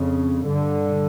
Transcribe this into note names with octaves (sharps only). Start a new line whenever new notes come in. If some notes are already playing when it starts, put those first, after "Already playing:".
Already playing: F2 C#3
G2 D3